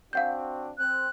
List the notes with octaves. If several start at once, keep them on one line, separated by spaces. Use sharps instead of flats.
C4 D4 F#4 F5 F#5 G6
C4 F#6